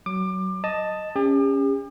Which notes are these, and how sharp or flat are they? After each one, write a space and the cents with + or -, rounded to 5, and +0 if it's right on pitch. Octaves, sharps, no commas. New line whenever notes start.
F#3 +20 D6 +25
D#5 +0 A5 +5
C#4 +0 G4 +45